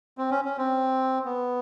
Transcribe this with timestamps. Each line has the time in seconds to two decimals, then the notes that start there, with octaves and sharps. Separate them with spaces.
0.18 C4
0.31 C#4
0.45 C#4
0.58 C4
1.25 B3